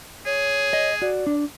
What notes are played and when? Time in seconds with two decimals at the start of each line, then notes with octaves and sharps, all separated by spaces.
0.26 G#4 C#5
0.73 D#5
1.02 F#4 D5
1.27 D4